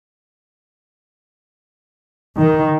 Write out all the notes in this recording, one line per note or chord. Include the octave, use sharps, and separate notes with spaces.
D#3